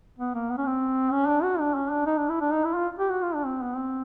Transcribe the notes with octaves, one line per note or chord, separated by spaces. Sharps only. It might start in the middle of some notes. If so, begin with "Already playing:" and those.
B3
A#3
B3
C#4
C4
C#4
D4
F#4
D4
C#4
D4
D#4
D4
E4
D4
D#4
E4
F4
G4
F#4
F4
D4
C4
B3
C4